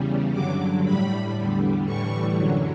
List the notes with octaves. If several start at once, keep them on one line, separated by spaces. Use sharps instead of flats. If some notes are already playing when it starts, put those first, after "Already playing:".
Already playing: E2 C#3 G3
G2 D3 F#3 D6
A2 G3 B5
E2 D3 G3
A2 E3 G3 C#6
F#2 D3 F#3